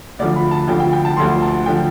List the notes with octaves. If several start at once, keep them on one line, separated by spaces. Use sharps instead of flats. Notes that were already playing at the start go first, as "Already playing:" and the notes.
D2 D3 F3 D5
B5
A5
D2 D3 F3 G5
G5
G5
A5
D2 D3 F3 C6
A5
D3 F3 G5